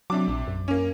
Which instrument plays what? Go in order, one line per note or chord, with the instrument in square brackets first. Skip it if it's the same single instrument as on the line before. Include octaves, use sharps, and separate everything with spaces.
[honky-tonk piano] C3 D4 D6 [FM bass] F#3
[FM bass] A#1
F#2
[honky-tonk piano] A#3 C#4